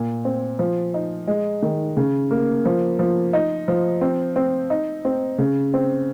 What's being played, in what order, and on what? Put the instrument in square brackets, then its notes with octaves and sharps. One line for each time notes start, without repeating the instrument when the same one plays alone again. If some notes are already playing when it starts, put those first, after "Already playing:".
Already playing: [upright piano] A#2
C4
F3
D#4
G#3
D#3
C#3
A#3
F3
F3
D#4
F3
C4
C4
D#4
C4
C#3
C4